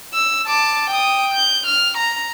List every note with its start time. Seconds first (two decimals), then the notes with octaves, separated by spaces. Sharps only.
0.14 E6
0.47 A5 D6
0.90 G5 D#6
1.34 G6
1.66 F6
1.97 A#5